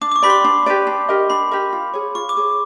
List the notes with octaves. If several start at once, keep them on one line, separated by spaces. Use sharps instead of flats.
D4 D6
D6
C#6
G4 B4 D5 B5
C6
D4
G4 B4 D5
D4
G4 A#4 D#5
D4 B5
G4 A#4 D#5
F4
G#4 C#5
F4 C#6
D6
G#4 C#5